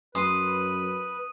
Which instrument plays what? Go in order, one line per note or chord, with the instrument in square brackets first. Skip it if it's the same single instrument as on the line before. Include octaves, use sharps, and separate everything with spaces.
[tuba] F#2 [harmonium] B4 [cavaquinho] C6 [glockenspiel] D#6 D#7